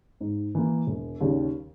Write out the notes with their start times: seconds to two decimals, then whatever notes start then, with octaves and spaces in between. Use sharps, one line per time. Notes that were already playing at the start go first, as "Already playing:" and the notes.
0.21 G#2
0.55 E3 A#3
0.87 E1
1.21 D#2 C#3 G3